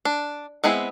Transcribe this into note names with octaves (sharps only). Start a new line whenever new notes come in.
D4
G#3 B3 C4 E4 G#4